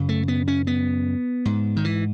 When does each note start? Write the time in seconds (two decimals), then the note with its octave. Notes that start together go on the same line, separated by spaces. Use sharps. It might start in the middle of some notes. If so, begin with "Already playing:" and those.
Already playing: F#2 C#3
0.09 A3
0.28 B3
0.48 C#4
0.67 B3
1.45 G#2
1.77 D#3
1.85 E3